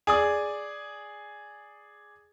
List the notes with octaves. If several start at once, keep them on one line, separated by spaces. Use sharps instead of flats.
G#4 D5 D#6